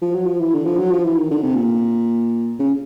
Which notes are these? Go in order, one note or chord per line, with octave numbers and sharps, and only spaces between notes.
F3
F#3
F3
E3
D3
F3
F#3
F3
E3
D#3
D3
C3
A#2
C#3